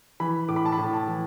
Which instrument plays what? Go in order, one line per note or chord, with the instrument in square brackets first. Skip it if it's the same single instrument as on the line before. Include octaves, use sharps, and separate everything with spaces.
[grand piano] E3 B5
A2 D6
B5
A5
B5
A2
A5
E3